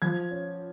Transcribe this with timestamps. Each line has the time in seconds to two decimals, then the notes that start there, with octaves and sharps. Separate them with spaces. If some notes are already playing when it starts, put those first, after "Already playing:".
0.02 F3 G#6
0.31 C#4